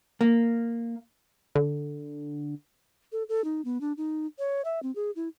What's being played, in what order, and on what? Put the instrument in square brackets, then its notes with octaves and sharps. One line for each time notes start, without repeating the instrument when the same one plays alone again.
[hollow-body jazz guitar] A#3
[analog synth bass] D3
[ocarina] A4
A4
D#4
B3
D4
D#4
C#5
E5
C4
G#4
E4